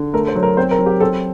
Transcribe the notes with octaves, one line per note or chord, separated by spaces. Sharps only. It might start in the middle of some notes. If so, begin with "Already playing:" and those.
Already playing: D3
A3 A#4
C5
F#3
A#4
C4 C5
A#4
F#3
G4
C4 A4